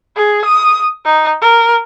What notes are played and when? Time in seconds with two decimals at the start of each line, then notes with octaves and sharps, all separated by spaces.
0.17 G#4
0.45 D#6
1.06 D#4
1.42 A#4